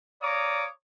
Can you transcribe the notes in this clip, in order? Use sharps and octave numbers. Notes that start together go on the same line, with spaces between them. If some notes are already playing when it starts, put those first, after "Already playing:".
C#5 D5 F5 A#5 D6 D#6